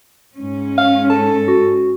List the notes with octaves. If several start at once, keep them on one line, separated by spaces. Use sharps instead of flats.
G#2 C#4
F5
A4 A5
F#4